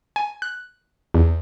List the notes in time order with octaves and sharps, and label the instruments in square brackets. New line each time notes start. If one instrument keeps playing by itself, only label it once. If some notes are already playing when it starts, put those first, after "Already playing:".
[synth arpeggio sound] G#5
F#6
E2